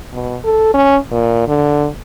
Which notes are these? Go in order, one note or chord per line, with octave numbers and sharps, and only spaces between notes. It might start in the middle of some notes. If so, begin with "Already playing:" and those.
B2
A4
C#4
A#2
D3